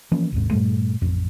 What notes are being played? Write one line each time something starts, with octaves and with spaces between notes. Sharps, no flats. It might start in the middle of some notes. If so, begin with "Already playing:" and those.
E3 F3 A#3 C#4
G#1 D#2 G#2
G2 A#2 G3 A3
A1 F2